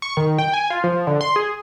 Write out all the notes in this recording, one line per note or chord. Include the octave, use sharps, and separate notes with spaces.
C#6
D#3
G5
G#5
F4
F3
D3
C6
G#4